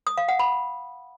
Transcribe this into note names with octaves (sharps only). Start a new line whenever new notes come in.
D#6
F5
F#5
B5